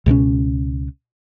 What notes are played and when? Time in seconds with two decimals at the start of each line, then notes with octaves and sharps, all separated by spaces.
0.06 C#2 B2 G#3 C#4